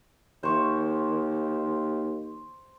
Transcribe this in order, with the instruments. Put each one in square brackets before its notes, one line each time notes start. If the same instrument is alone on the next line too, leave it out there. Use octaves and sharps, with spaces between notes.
[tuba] D#2 [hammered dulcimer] C5 C#6